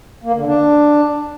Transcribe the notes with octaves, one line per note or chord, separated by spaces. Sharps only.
A#3
D3
D4